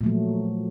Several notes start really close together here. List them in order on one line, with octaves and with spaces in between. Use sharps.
A#2 A3 F#3 F3